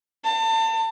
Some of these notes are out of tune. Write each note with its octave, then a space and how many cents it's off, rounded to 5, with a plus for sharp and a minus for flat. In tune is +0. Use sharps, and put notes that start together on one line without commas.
A5 +30